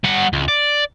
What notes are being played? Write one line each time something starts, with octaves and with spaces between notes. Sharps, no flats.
G3 F#5
C#2
D5